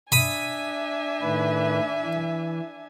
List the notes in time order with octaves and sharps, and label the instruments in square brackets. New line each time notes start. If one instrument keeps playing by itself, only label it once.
[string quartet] D4 E5 G#5 [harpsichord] B5 D#6
[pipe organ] A2 D#3 B4
E3